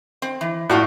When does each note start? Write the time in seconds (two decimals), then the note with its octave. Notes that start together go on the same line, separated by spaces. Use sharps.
0.22 C4
0.41 E3
0.70 A2 F4 F#4 D5